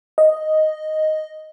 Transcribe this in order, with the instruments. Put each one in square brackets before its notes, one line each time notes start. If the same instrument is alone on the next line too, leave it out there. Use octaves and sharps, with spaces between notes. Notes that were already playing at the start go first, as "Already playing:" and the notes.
[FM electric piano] D#5